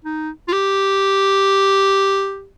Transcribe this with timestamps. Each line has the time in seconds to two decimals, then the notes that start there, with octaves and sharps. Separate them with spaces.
0.05 D#4
0.48 F4
0.53 G4